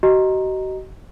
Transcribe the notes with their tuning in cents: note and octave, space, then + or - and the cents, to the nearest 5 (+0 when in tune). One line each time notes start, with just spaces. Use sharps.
F#4 +40 D#5 +0 A#5 +0